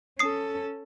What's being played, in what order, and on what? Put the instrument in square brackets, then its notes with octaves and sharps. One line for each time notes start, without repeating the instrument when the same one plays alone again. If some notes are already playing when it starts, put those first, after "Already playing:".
[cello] C#4 A4 [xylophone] D#6 C7